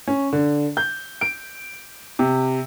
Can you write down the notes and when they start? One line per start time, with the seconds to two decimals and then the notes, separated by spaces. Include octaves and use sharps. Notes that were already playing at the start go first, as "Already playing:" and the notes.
0.08 C#4
0.33 D3
0.77 G6
1.21 D7
2.19 C3